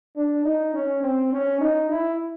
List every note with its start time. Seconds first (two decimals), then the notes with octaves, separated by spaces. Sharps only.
0.16 D4
0.45 D#4
0.74 C#4
1.03 C4
1.33 C#4
1.61 D#4
1.90 E4